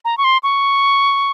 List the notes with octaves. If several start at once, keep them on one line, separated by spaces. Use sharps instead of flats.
A#5
C#6
C6
C#6